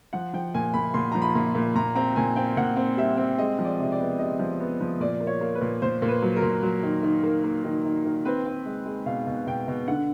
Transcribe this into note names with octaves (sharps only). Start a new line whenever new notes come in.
F3 F#5
F3 G5
A#2 G#5
A#2 B5
A#2 C6
F3 A#5
B5
A#2
A#2
A#2 A#5
C4 A#5
A#2 G#5
C4 G5
A#2 F#5
C4
G3 E5
C4
G#3 D#5
F3
D5
C3
D5
B3
C3 D#5
F3
B3
F3
A#2 D5
A#3
C#5
A#3
B4
A#2
A#2 C5
A#2
B4
F#3
A#4
A#2
F#3
D#3
D#3
A#3
A#3
D#3
D#3
D#3
C4 B4
C4
G#3
G#3
B2 F5
B2
B2 G5
B2
D3 F#5